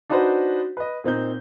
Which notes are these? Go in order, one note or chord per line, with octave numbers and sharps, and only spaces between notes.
D4 D#4 F#4 B4 C5 F#5
B4 D#5
A#2 C4 D#4 G6